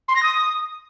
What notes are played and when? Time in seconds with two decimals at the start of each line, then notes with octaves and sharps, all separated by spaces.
0.08 C6
0.15 A#6
0.22 D#6